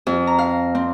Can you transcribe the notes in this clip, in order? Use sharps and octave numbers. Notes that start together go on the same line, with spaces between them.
F2
A#5
F5
C4